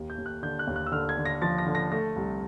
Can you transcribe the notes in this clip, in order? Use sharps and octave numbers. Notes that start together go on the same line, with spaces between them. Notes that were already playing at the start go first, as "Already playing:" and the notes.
Already playing: D#2
G6
D#2
F#6
D3 G6
F#6
D#2
F#6
E6
D3 F6
G#6
D3
A#6
F3 A6
A#6
D3
A#6
A3 A#6
C2